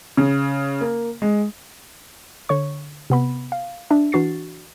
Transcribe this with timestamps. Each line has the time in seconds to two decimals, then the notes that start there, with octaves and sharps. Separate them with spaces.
0.17 C#3
0.81 A#3
1.22 G#3
2.49 D3 C#5 C#6
3.10 C3 B3 B5
3.52 F5
3.90 D4 E5
4.12 E3 D4 F#4 C#6 A6 C7